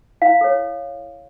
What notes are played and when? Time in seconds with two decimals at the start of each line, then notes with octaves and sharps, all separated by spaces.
0.22 E4 F5
0.41 A4 C#5